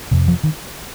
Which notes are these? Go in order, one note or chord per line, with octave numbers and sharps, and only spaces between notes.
F2 C3
F3
D#3